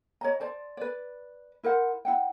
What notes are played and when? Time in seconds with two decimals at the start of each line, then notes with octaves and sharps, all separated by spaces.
0.21 C#5 D#5 A#5
0.40 C5 D5 A5
0.77 B4 D5
1.63 E4 A#4 C5 F#5
2.05 E4 F#5 G5